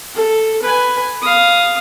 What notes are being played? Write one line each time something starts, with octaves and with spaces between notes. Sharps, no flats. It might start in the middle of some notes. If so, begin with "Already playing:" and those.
A4
B4 G#5
F5 D#6